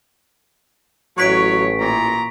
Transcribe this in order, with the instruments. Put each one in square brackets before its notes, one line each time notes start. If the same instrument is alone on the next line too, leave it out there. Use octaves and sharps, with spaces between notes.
[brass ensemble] A1 [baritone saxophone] F#3 [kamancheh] C#5 [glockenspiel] C#6 B6 D7
[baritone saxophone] A#2 [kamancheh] A#5